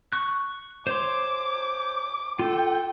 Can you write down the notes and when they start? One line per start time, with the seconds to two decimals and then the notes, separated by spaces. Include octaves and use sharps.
0.12 C#6 F#6
0.87 C5 C#5 C6 D6
2.39 F4 A4 G5